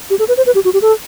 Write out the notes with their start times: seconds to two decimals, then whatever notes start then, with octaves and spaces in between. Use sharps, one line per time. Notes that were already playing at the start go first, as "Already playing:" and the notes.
0.10 G4
0.19 A4
0.28 B4
0.37 C5
0.46 B4
0.55 G4
0.65 F#4
0.73 G4
0.82 A4